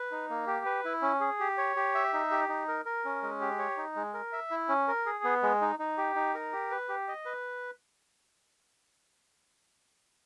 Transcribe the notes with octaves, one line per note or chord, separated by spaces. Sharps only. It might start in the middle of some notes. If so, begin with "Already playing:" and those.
Already playing: B4
D#4
A#3
G4
B4
E4
C#4
G#4
G4
C#5
G4
E5
D#4
G4
D#4
A#4
A#4
C#4
G#3
G4
C#5
D#4
G#3
A#4
E5
E4
C#4
A#4
G#4
B3
G#3
D#4
D#4
G4
D#4
A#4
G4
B4
G4
D#5
B4